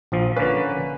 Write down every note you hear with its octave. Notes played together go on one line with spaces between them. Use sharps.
A#1 F3
D3 A#3 C#4 B4